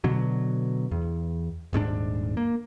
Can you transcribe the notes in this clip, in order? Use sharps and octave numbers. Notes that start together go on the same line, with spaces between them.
B2 D3 F#3
E2
D#1 G#2 C#4 D4
A#3